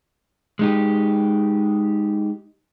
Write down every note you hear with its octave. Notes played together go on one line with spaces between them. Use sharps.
G#3 D#4 G4